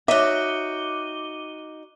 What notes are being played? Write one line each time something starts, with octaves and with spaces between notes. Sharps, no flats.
D#4 F#4 C#5 D#5 E5 D6 D#7 G7